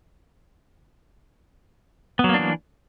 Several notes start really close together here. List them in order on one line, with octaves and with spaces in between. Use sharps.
B3 F#3 A#3 D4 E3